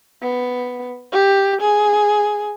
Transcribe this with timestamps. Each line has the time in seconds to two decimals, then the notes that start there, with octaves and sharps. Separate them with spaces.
0.22 B3
1.12 G4
1.61 G#4